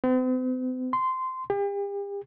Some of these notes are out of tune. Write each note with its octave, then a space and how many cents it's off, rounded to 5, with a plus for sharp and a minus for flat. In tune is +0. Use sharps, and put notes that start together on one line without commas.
C4 -45
C6 -15
G4 +40